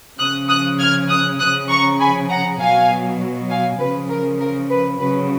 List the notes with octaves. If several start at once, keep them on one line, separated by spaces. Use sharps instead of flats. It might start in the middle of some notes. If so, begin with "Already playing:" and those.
C#3 F3 D#6 F#6
D#6 F#6
F6 G#6
D#6 F#6
C#3 F3 D#6 F#6
A#5 C#6
G#5 B5
F#5 A#5
B2 F#3 F5 G#5
F5 G#5
C#3 F3 B4
A#4
A#4
B4
C#3 F#3 B4